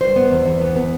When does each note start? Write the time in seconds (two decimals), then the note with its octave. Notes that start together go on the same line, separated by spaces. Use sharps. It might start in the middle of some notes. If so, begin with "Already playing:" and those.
0.01 G2 C5
0.16 B3
0.31 E2
0.45 E2
0.61 B3
0.76 B3